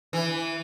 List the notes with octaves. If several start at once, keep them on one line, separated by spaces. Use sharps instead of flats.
E3